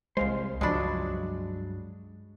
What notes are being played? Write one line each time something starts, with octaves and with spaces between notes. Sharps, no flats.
C2 G#3 C5 F5
C#2 G2 F3 F#3 G#3 D4 B5